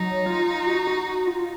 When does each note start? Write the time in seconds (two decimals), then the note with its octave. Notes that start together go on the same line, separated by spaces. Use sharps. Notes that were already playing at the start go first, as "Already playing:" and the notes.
Already playing: F#3 D#4
0.26 F4
0.67 F#4
0.87 F#4
1.07 F#4
1.27 F4